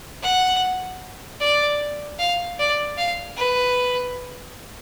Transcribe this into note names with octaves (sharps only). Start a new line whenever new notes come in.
F#5
D5
F5
D5
F5
B4